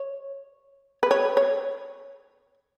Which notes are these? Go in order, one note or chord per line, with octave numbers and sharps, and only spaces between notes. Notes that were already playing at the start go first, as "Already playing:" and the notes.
Already playing: C#5
B4
C#5
C#5